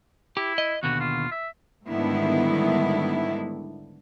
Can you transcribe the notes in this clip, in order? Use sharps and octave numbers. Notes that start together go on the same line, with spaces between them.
E4 G4
D#5
D#2 B2 D3 F#4
F4
E5
G#2 D3 D#3 G3 B3 E4